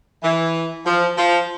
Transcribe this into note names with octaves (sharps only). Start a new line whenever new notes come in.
E3
F3
F3